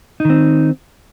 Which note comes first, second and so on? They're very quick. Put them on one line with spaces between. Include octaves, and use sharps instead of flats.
D#4 D#3 C4